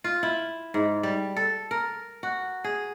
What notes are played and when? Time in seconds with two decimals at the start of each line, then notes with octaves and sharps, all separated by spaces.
0.04 F4
0.23 E4
0.74 G#2
1.03 G3
1.36 A4
1.71 A#4
2.23 F#4
2.64 G#4